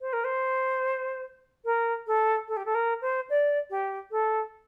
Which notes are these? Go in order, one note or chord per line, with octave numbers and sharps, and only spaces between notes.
C5
A#4
C5
A#4
A4
A4
G4
A4
A#4
C5
D5
G4
A4